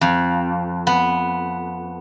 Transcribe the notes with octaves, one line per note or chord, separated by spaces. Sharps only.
F2
B3